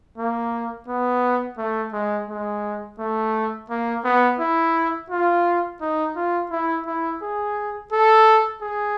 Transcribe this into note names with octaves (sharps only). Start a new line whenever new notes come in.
A#3
B3
A3
G#3
G#3
A3
A#3
B3
E4
F4
D#4
F4
E4
E4
G#4
A4
G#4